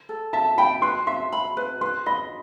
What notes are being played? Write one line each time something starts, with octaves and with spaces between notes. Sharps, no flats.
A4
E5 A5
G5 B5
B4 C6
E5 C6
B5
B4
B4 C6
D#5 B5